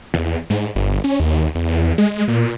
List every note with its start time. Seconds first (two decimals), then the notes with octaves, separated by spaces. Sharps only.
0.14 E2
0.50 G#2
0.75 G1
1.04 C#4
1.20 D#2
1.55 E2
1.98 G#3
2.28 A#2